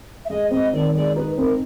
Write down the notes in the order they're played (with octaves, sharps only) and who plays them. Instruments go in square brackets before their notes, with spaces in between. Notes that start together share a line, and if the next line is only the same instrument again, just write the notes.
[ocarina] E5
[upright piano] G#3 [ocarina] D#5
[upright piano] C4 [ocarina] D#5
[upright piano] D#3 [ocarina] D5
[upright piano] G#3 [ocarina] D5
[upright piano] D#4 [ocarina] B4
[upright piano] C4 [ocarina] A#4